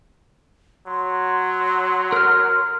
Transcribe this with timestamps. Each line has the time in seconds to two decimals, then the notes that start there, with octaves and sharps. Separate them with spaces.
0.87 F#3 C6
2.12 A#4 F6